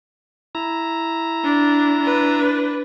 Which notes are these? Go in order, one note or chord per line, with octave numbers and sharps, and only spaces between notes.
E4 A#5
D4
D4 B4